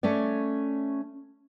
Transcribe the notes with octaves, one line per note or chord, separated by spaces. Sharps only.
A3 C#4 C#5 D5